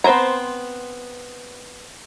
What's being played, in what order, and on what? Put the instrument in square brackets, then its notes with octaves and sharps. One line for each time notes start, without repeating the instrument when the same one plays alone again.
[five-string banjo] B3 C4 C5 G#5 A#5